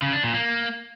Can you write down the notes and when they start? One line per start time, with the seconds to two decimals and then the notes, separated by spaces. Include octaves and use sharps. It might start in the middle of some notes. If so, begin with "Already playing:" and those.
0.02 C#3
0.13 D4
0.24 A#2
0.34 A#3